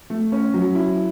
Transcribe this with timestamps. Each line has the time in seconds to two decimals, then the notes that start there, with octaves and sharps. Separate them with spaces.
0.10 A3
0.32 C#4
0.54 F#3
0.75 E4